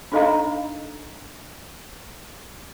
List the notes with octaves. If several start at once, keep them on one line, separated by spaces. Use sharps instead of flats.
D4 D#4 A4 D#5 F5 A#5